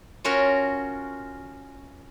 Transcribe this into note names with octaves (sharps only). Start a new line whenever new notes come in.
C#4 F4 F#4 A#4